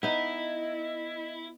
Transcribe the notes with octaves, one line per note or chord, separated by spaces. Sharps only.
B3 D#4 E4 D#5